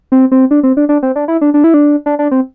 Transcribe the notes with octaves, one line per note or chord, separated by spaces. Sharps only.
C4
C4
D4
C4
D4
D4
C4
D4
E4
D4
D4
E4
D4
D4
D4
C4